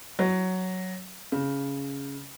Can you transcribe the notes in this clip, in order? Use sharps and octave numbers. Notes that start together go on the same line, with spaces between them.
F#3
C#3